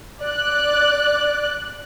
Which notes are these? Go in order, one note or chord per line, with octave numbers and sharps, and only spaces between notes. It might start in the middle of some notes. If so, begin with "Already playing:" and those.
D5 F#6